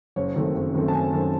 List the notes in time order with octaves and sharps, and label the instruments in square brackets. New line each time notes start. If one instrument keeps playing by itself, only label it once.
[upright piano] F#1 C#5
F#2 D#3 A3 C4
F#1
F#2 D#3 A3 C4
A5
F#1 G#5
F#2 D#3 A3 C4